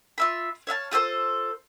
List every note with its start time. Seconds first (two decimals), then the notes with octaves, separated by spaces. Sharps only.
0.18 F4 E5 B5
0.67 C#5 E5 F5 A5
0.91 F4 G4 A4 C5